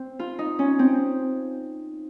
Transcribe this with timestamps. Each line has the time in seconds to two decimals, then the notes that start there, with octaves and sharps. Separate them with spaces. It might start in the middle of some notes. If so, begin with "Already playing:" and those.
Already playing: C4
0.19 F4
0.39 D#4
0.59 C#4
0.79 C4